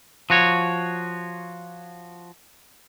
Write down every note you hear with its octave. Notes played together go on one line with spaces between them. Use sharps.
F3 F#4 C#5